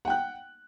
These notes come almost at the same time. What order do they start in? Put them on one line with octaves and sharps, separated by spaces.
F#5 G5 F#6